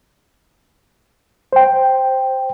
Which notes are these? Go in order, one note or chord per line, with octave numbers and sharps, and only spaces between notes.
C5 G5